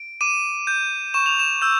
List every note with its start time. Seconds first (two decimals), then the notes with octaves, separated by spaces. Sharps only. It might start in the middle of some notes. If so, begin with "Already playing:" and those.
Already playing: D7
0.21 D6 D#7
0.67 G6
1.14 C#6 E7
1.26 F7
1.39 E7
1.62 E6 G6